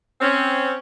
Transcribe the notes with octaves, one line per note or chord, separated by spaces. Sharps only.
C4 C#4